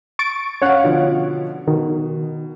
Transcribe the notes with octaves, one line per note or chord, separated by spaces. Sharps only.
C#6 A6 D7
C#4 C#5 F5 F#5
B2 D3 F3
B2 D#3